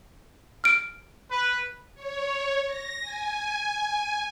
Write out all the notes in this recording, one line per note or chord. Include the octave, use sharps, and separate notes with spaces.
F6 D7
B4
C#5
A#6
G#5